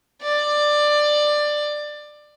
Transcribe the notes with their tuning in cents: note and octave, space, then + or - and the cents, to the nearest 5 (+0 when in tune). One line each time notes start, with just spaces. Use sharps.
D5 +15